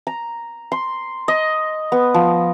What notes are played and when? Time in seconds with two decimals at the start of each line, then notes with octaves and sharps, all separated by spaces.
0.07 A#5
0.72 C6
1.28 D#5
1.92 B3
2.14 F3